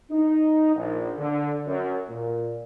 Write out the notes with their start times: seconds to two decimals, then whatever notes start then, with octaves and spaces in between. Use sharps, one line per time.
0.11 D#4
0.76 A#1
1.18 D3
1.66 F#2
2.09 A#2